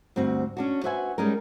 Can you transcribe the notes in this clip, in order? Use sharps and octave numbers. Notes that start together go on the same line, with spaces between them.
D2 G2 C4 F#4
C#4 D4 F#4
F#4 B4 C5 E5 F#5 G#5
G3 G#3 C#4 D#4 A#4